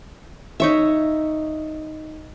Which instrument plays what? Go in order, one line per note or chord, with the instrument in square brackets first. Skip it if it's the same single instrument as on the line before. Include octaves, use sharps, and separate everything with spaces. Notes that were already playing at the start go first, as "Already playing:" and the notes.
[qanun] D#4 C#5 E5